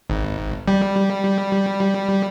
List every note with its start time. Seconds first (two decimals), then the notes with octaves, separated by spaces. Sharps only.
0.10 G#1
0.68 G3